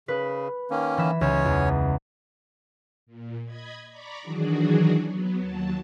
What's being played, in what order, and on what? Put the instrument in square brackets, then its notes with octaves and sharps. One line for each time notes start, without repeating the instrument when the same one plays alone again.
[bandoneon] C#3 [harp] B4
[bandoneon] D#3 A#3 C#4
[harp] E3 E5
[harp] C#2 [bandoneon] C#4 C#5
[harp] E2
[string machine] A#2
D#5 B5 G#6
D5 A#5 B5 C#6 D6
D#3 E3 F#3 D4 F#4 G#4
F#3 B3
D#2 F#3 A5